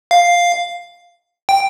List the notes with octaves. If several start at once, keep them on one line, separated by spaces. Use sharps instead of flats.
F5
G5